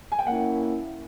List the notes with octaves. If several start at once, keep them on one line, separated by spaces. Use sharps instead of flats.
G#5
G5
A#3 C#4 E4 F#5